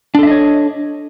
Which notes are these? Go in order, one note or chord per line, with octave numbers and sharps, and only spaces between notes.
D4 A4 C#5 D#5 E5